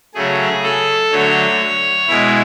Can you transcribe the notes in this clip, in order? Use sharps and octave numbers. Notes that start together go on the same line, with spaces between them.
C#3 F#3 A3 G#4
A4
D3 F#3 A3 C#5
B2 G#3 E4